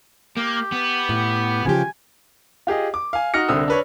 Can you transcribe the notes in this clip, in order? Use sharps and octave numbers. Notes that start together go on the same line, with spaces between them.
A#3 G4
B3
A2
C#3 F3 G4 G#5
F4 G4 G#4 D#5
D6
F5 G#5
D#4 F#4 F6 A#6 C#7
C2 D3 C4 D#6 E6
D4 B4 C#5